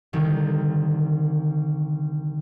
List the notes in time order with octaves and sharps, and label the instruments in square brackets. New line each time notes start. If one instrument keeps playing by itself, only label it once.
[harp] C2 D3 D#3